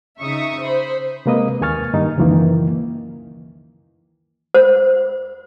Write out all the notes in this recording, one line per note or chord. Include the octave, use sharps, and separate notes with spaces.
C#3 D#4 E5 C#6 D#6
C5 B5
C3 G#3 A#3 B4 D#5 D#6
D#2 A#3 G#5 C#6 F6 A6
G2 D#3 D#4
C#2 F#2 D#3 E3 A#3
C5